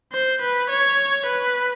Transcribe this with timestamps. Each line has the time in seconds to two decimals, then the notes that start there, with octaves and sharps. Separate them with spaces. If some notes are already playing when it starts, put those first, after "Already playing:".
0.13 C5
0.42 B4
0.70 C#5
1.27 B4